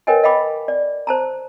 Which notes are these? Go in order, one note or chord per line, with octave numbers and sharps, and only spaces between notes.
A#4 B4 C#5 D#5 G5 G#5
D#5 F5 G5 B5 D6
D5
C5 A5 A#5